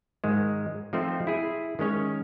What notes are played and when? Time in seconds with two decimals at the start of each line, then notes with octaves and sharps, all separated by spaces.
0.24 G#2 D#3 G#3
0.93 F3 A3 C4 D#4 C5
1.27 E4 G#4
1.79 D#3 G#3 C#4 C#5